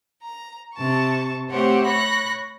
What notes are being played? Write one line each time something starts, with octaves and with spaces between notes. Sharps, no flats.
A#5
C3 A5 C#6
A3 C4 G4 C5 C#5 F#5
C#5 B5 C#6 F#6 A#6